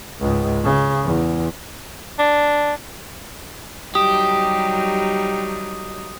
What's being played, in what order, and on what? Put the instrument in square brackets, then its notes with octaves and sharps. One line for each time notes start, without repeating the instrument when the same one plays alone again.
[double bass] C#2 G#2
C#3
E2
[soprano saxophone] D4
[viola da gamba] F#3 G3 D#4 [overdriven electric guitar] G4 [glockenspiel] D#6 E7